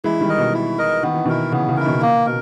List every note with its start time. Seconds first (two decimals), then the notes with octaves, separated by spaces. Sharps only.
0.04 E3 G#3 E4
0.21 D#3 G3
0.29 A#4 D#5
0.38 B2
0.54 E4
0.78 A#4 D#5
1.03 D#3 B3
1.14 E3
1.25 B2 D#3 E4 A#4
1.52 C#3 E3 B3
1.69 C#3 E3
1.77 E4 A#4
1.86 B2 D#3
2.02 A#2 A#3
2.26 B2 A#4